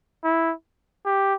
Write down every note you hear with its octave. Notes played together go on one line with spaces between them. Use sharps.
E4
G4